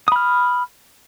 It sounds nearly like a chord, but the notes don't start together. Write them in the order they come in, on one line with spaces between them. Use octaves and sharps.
D#6 B5 F6